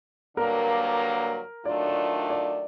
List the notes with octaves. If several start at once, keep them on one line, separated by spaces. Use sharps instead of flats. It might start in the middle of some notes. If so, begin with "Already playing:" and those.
G2 D3 F#3 A#3 A#4
D#3 F#3 A3 D4 F4 D5
D5
D5